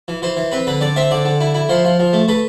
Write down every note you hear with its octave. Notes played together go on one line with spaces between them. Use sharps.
E3
E3 C5
E3
C4 B4
D3 B4
D3 D5
C4 E5
D3 D5
D3
E4
E4
F3 C5
F3
F3
A3
A3 B4